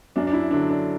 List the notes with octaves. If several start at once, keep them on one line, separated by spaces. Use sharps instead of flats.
F#2 D4
D4
E4
D3 F#3 D4
D4